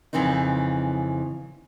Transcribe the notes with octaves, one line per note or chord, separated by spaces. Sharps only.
F2 C#3 E3 C4 D#4